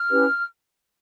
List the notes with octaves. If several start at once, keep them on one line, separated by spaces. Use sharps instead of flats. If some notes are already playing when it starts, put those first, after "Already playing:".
Already playing: F6
C#4 E4 G4 B4